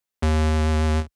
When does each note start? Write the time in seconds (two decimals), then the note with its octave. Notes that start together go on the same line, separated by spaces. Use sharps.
0.22 D#2